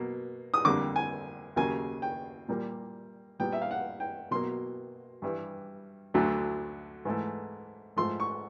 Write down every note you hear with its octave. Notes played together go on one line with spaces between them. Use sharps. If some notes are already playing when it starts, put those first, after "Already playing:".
Already playing: B2 F#3 A#3
D#6
F2 D3 G3 A#3 D6
G#5
D#2 C#3 F#3 A#3 G#5
G5
A#2 G3 A#3
A#2 G3 B3 G5
E5
F5
F#5
G5
B2 F#3 A#3 C6
G2 E3 G3
D2 D3 F#3 A3
G#2 E3 A3
G#2 F3 A3 C6
C#6